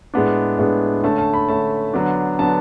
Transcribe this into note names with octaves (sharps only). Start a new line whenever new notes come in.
A2 G#3 B3 D4
A2 G#3 B3 D4
D3 A3 C#4 A5
A5
B5
D3 A3 C#4 A5
D3 F#3 B3 D4
D3 F#3 B3 D4 A5